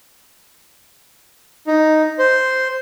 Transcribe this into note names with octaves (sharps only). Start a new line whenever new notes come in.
D#4
C5